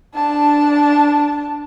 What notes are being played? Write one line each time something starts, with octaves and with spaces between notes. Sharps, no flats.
D4 A5